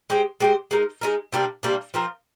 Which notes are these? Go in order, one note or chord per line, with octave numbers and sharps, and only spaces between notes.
G#3 C4 G4 C5
G#3 C4 G4 C5
G#3 D#4 A#4
G#3 D#4 A#4
C3 G3 A#3 D4
C3 G3 A#3 D4
F3 C4 F4 A#4